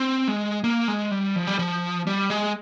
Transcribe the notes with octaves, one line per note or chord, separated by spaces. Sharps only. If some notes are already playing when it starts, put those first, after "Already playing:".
Already playing: C4
G#3
A#3
G#3
G3
F3
G3
F3
G3
G#3